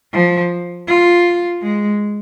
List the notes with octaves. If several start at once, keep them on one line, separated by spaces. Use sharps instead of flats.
F3
F4
G#3